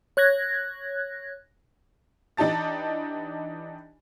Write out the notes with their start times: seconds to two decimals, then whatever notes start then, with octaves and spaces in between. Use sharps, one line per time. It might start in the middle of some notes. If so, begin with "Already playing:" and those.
0.17 C#5 F#6 G#6 A#6
2.37 E3 D4 D#4 G4 A5 A6